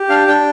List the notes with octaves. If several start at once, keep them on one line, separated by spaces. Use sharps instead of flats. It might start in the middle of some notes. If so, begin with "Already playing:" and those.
Already playing: G4
D4 F5
D4 G5